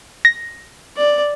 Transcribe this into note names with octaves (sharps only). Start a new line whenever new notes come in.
A#6
D5